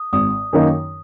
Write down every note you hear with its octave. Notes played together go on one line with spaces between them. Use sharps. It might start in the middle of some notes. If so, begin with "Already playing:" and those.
Already playing: D#6
G#1 D#6
F#2 D#3 A#3 D#4